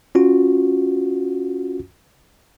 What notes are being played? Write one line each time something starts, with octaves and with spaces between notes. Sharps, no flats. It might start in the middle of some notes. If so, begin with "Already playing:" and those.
C#4 F4 F#4